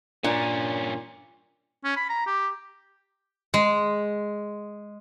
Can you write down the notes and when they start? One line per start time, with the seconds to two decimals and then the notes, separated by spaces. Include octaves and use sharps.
0.24 G2 A#2 C#4 D4
1.84 C#4
1.97 B5
2.09 A#5
2.26 G4
3.54 G#3